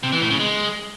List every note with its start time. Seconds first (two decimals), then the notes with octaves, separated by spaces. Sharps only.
0.03 C3
0.12 E3
0.21 A2
0.30 C#3
0.40 G#3